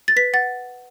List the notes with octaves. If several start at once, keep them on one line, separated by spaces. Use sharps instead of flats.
A6
B4 B6
F#5 A6